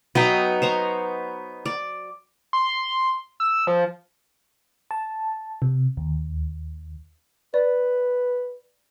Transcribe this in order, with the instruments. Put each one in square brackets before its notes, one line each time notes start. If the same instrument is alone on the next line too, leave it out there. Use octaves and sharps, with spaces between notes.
[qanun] F#3 G5 [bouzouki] B3 D#4
[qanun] C5 C#5 A#5
D5
[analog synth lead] C6
E6
F3
[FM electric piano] A5
C3
D#2
[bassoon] B4 [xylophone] D5